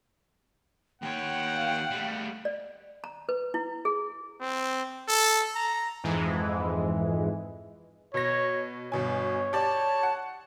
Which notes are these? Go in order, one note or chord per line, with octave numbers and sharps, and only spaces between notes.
D#2 C#5 F#5 G5
F5
G3 A3
D5
A#5
B4
E4
G#4
C4
A4
A#5
F2 G#2 E3 G#3
B2 C#5 A#6
G1 B2 C#5 G#5
G4 D5 A5
F#5